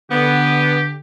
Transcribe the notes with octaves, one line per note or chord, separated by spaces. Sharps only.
D3 B3 G4